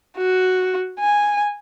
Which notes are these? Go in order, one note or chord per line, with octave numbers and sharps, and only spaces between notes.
F#4
G#5